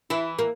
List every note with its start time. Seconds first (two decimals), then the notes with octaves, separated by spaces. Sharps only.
0.10 E3 E4
0.39 A#3